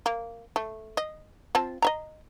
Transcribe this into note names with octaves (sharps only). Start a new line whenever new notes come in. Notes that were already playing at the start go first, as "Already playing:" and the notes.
A#3
A3
D#5
C4 F4 A5
D#5 E5 A#5